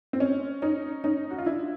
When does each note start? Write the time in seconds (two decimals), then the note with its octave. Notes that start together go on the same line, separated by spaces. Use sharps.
0.13 C4
0.20 C#4
0.62 C#4 D#4
1.04 C#4 D#4
1.31 F#4
1.38 F4
1.46 D4 E4